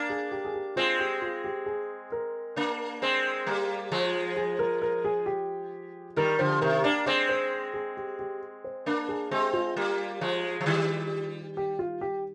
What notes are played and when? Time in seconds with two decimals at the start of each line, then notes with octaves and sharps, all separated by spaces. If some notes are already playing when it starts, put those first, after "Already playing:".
Already playing: A#3 D4
0.10 G#4
0.32 G4
0.45 G#4
0.54 G4
0.76 G#3 C4 F4
0.99 G4
1.22 F4
1.44 G4
1.66 G#4
2.12 A#4
2.56 A#3 D4
3.02 G#3 C4
3.46 G3 A#3
3.92 F3 G#3
4.36 G#4
4.59 A#4
4.82 A#4
5.05 G#4
5.26 G4
6.16 D#3 G3 A#4
6.39 D3 F3 C5
6.61 C3 D#3 A#4
6.84 A#3 D4 D5
7.06 G#3 C4 D5
7.29 C5
7.74 G#4
7.97 G4
8.19 G4
8.64 C5
8.86 A#3 D4 A#4
9.09 G#4
9.31 G#3 C4 G4
9.53 F4
9.76 G3 A#3
10.21 F3 G#3
10.61 F3
10.66 D#3 G3
11.57 G4
11.79 F4
12.01 G4